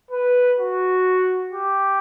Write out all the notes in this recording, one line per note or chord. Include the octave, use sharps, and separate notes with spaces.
B4
F#4
G4